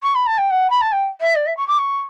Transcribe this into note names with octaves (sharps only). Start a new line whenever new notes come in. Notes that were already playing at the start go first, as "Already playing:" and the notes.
C#6
B5
A5
G5
F#5
B5
A5
G5
E5
D5
E5
C#6
D6
C#6